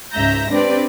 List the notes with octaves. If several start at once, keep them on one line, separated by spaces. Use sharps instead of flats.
C#2 G#2 E5 A#5 G6 A#6
C4 D4 G4 B4 D5